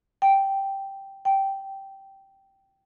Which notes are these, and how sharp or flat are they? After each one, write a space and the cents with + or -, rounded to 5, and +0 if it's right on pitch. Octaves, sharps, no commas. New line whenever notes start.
G5 -5
G5 -10